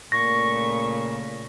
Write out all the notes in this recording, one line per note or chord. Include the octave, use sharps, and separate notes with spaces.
A#2 C#3 A3 C#6 A#6